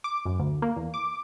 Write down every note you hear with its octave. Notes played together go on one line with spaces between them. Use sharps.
D6
F#2
D2
A#3
E2
D6